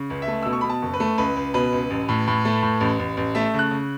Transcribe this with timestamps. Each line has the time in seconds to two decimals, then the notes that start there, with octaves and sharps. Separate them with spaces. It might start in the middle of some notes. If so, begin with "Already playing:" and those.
Already playing: C#3
0.10 C#2
0.22 E5
0.28 A3
0.43 B2 E6
0.53 C#6
0.61 B2 B5
0.70 A5
0.82 F#1
0.94 B4
1.00 A3
1.18 C#2 B4
1.37 C#2
1.54 B2 B4
1.73 C#2
1.90 A1
2.09 A2
2.27 A2
2.45 A3
2.63 A2
2.80 A1
2.99 A1
3.17 A1
3.35 A3 E5
3.54 C#3
3.59 F#6
3.71 C#3